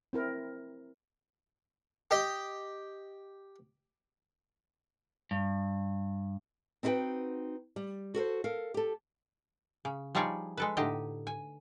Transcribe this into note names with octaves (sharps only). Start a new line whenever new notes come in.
C4 E4 A#4
G4 D#5
G2
C4 D#4 E4 F#4 B4 G5
G3
F#4 A4 A#4 C5
A4 A#4 F5
G4 A4
C#3
F3 G3 D#4 G#4 C#5 D5
G#3 A4 B4
A2 D3 D#4 G4 D#5
G#5